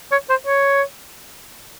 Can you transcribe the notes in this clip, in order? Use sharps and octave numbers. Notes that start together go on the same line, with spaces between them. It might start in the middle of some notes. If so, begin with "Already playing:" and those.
C#5
C5
C#5